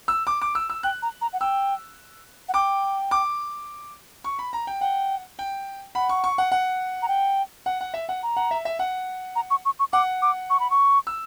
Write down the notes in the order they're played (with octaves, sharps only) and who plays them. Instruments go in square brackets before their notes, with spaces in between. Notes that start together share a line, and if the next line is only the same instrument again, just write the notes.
[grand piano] E6
D6
D6
E6
E6
[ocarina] G5 [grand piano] F#6
[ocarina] A#5
A#5
F#5
[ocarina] G5 [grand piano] E6
[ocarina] F#5
[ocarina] G5 [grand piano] D6
[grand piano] D6
C#6
B5
A#5
G5
[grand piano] F#5 [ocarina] G5
[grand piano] G5
[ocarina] F#5 [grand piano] B5
[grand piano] C#6
C#6
F#5
F#5
[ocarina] A#5
G5
[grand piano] F#5
F#5
E5
F#5
[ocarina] A#5
[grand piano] F#5
E5
E5
F#5
[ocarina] A#5
C#6
C#6
C#6
[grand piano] F#5 [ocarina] D6
[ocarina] D6
C#6
B5
C#6
[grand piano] E6